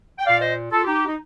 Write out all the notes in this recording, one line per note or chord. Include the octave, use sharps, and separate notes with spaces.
G5
A#2 D5 F5
C5 D#5
F4 A4
D#4 G4
D#4